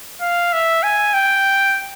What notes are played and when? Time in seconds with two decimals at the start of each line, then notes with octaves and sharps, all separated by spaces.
0.21 F5
0.53 E5
0.83 G#5
1.14 G5